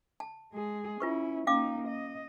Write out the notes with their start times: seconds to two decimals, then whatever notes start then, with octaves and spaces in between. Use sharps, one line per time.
0.20 A5
0.53 G#3 G#4
1.00 C#4 E4 F4 B4 C#6
1.47 A#3 C#4 D#4 F5 D6
1.88 D#5